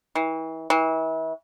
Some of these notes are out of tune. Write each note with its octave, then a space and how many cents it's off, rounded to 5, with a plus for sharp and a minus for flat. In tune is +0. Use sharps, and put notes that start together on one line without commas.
E3 -35
E3 -35